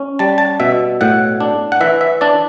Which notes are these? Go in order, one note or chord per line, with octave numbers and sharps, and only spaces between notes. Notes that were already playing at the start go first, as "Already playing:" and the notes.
Already playing: C#4
G3 A5
A5
B2 E5
A2 F#5
D4
F#5
E3 E5
E5
D4 D5